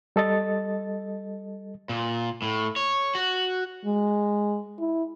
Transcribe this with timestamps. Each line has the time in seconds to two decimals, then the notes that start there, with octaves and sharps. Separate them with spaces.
0.16 G3 A4 D#5 A6
1.89 A#2
2.42 A2
2.76 C#5
3.15 F#4
3.85 G#3
4.79 E4